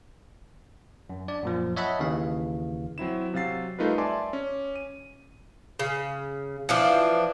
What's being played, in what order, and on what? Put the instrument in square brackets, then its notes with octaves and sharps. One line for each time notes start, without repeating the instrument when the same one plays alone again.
[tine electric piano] F#2
D4 D5
F#2 A#2 F3
C#5 D#5 E5 F#5 A5 B5
D#2 C#3 E3 F5
[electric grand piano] F#3 C4 E4 E7
C3 F#3 F5 A6 C7
G3 A3 D#4 F4 A#4 B4
D5 E5 G#5 A5 C6 D6
C#4
D#7
[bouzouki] C#3
E3 F3 D4